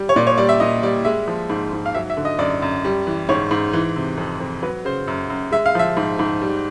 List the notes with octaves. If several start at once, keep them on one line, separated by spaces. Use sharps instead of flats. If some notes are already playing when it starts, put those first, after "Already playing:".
Already playing: G3
C#5
A#2 D5
C#5
G3 D5
E5
A#2 D#5
G3 D5
G#3 E5
F3
G#2
G#2
F5
F#3 E5
E5
D3
D#5
F#2 D5
F#2
G3
E3
G#2 C#5
G#2
E3
C3
F2
F2
F#3 B4
C#3 C5
F#2
F#2
G#3 E5
F5
F3 E5
G#2
G#2
G3